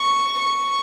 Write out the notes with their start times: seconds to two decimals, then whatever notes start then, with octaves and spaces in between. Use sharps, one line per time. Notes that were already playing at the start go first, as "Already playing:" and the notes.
Already playing: C#6
0.39 C#6